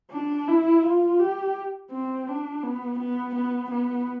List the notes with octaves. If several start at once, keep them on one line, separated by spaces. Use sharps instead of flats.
D4
E4
F4
G4
C4
D4
B3
B3
B3
B3